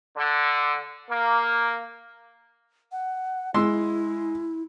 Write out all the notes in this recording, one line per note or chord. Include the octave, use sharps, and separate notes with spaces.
D3
A#3
F#5
G#3 E4 C6 E6